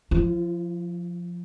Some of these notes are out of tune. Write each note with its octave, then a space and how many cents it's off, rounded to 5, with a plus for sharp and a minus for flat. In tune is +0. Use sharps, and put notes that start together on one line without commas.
F3 +5 F4 -40